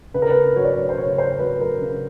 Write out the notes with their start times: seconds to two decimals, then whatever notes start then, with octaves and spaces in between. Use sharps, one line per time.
0.14 C#3 B4
0.22 A#4
0.30 B4
0.56 F#3 C#5
0.64 D5
0.72 C#5
0.89 C5
0.98 C#3 C#5
1.18 C5
1.39 F#3 B4
1.61 A#4
1.81 C#3